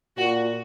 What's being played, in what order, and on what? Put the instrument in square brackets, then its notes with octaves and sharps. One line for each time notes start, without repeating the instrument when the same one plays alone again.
[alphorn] A#2 [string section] F#4